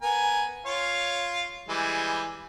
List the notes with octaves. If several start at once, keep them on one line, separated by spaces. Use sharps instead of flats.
B3 A#4 G#5
F4 C#5 F5
E3 G3 G#3